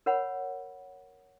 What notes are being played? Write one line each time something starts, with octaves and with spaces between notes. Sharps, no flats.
A#4 C#5 F#5 B5